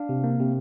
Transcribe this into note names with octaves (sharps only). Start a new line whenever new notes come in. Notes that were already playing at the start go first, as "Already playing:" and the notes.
Already playing: D4 F5
C3
A#3
C3